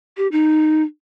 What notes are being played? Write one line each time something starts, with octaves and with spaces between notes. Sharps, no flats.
G4
D#4